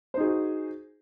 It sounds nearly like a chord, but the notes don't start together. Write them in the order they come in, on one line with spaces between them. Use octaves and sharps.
C5 D#4 G#4 F#4